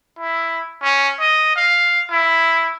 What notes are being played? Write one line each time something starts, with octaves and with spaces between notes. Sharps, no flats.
E4
C#4
D#5
F5
E4